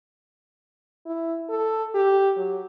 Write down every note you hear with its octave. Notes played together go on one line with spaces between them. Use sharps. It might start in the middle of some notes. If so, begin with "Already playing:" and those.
E4
A4
G4
F#3